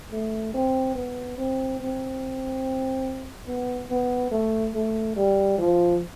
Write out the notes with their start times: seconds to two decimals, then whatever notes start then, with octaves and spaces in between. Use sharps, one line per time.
0.12 A3
0.54 C4
0.96 B3
1.38 C4
1.80 C4
3.47 B3
3.90 B3
4.32 A3
4.75 A3
5.16 G3
5.58 F3